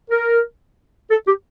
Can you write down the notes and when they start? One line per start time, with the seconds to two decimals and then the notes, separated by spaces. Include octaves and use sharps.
0.10 A#4
1.11 A4
1.28 G4